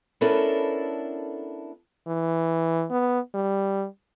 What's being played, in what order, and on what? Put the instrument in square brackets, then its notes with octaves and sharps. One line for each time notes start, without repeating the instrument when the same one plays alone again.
[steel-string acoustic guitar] B3 C#4 D4 E4 A4 A#4
[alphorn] E3
B3
G3